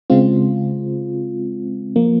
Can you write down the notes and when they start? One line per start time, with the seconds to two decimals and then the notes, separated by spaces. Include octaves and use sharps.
0.10 C#3 G#3 C4 F4
1.96 F3 A#3